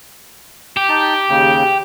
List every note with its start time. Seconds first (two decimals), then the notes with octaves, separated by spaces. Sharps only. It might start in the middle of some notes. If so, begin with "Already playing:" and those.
0.77 G4
0.89 D#4 G5 A5
1.29 D#2 C#3 G5